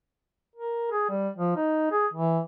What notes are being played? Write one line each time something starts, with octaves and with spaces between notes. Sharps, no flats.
A#4
G#4
G3
F3
D#4
G#4
E3